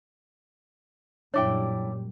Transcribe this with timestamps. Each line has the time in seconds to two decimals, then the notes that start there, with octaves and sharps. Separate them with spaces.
1.34 F#2 A#2 G3 D4 E4 C#5 G5 D6